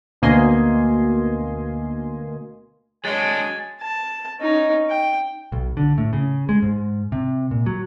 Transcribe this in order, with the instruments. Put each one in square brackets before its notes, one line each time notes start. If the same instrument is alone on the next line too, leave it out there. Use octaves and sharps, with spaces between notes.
[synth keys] D2 B2 A#3 D#5 G#5 C6
[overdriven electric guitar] F#3 D4 [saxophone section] G#3 [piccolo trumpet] G#5 [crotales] A6
[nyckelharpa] A5
C#4 D#4
G5
[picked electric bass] B1
D3
A2
C#3
G#3
G#2
C3
A#2
F#3